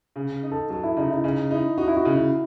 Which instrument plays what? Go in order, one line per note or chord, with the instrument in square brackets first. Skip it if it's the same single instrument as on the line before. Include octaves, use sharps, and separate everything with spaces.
[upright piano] C#3
D#4
[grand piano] A4
[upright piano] F#3 [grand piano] A4
[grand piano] E4
[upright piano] C#3 [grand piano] D#4
[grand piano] E4
[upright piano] C#3 [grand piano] D#4
[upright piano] D#4 [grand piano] E4
[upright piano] D#4 [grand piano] F#4
[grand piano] E4
F#4
[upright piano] C#3
[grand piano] E4